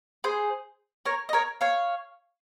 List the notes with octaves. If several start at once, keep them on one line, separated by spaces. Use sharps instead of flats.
G#4 C5
A#4 C#5
D#5
A#4 C#5
C#5 F5